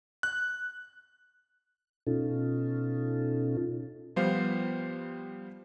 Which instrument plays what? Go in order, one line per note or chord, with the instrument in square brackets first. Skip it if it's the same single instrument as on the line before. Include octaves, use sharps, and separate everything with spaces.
[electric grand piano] F#6
[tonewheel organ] B2 C#4 D#4 F4 A4
[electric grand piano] F3 G3 B3 C5 F5